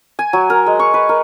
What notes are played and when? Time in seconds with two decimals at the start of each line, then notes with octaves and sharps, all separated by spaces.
0.19 G#5
0.33 F#3
0.50 A#4
0.66 G#3
0.79 C#6
0.94 B4
1.09 A#4